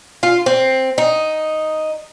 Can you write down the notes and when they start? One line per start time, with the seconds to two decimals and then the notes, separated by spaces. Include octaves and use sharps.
0.23 F4
0.46 C4
0.98 D#4